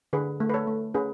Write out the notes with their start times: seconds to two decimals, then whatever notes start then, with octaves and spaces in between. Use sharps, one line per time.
0.13 D3 G#4 B4
0.40 A3
0.49 B4
0.54 A4 C#5
0.67 A3
0.94 C#4 G#4 B4